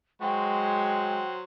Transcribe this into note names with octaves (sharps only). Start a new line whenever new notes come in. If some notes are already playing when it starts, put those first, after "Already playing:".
F#3 G#3 F#4 C5 G5